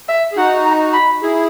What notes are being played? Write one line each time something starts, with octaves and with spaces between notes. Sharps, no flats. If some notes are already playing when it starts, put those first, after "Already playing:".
E5
G#4
D#4 F#4 F#5
A#5
B5
E4 G#4